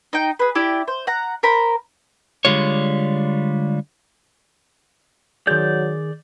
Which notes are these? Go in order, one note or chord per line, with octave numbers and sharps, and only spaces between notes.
D#4 G5
G#4 B4
E4 G4 D5
C5
F#5 A#5
A#4 C5 A#5 B5
D3 G3 G#3 F4 C#5
D#3 F#3 G#4 D5 G6